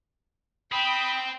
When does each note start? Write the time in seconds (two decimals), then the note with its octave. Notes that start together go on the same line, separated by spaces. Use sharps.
0.72 C4 G5 B5 D#6